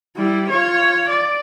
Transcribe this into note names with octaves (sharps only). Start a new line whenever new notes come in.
G3 E4
F4 C#5
D5